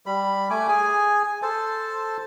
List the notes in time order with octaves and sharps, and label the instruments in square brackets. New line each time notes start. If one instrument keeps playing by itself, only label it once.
[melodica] G3 B5
A3 G#5 D6
G#4 G#5
A4 C5 A5